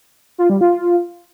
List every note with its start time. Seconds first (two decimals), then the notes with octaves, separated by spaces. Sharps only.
0.38 F4
0.50 G3
0.61 F4